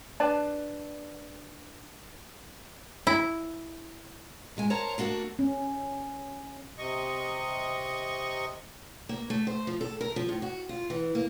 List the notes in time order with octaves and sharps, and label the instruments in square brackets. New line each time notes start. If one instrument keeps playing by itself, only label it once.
[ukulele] D4 B4 D5 A5
[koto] E4
[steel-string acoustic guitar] A#2 G#3 G#5
A#4 C5 C#5 F#5 A5 A#5
A3 A#3 D4 F#4 A4
[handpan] C#4
[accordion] C3 D#5 C#6
[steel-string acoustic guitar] A#3
A3
C5
F3
A4
A#4
F3
A2
F#4
F4
E3
A#3